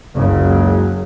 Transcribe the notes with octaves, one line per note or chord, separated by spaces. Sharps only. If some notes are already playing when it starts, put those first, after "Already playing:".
F#1 C#2 C#3 F#3